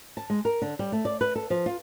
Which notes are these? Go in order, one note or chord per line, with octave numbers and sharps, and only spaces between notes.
A5
G#3
A#4
D3
G3
A3
D5
B4
A4
F3
F4